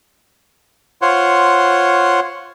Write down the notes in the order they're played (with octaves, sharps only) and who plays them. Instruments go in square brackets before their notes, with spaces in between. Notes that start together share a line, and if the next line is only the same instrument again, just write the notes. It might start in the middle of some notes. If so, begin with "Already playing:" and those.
[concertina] F4 C5 C#5 F#5